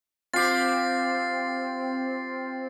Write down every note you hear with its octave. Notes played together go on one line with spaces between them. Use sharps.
C4 F4 G4 A6 C7